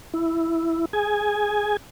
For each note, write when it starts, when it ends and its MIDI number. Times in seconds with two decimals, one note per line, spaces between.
0.14 0.85 64
0.93 1.77 68
0.93 1.77 80